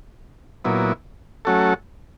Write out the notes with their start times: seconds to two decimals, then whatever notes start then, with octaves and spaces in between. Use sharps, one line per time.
0.65 A#2 F#3 B3 E4
1.45 F#3 A3 C#4 F#4 A4